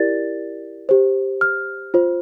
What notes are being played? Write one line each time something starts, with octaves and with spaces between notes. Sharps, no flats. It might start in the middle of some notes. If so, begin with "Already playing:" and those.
Already playing: E4 G4 A#4 D5 A6
G4 C5
F6
F4 C5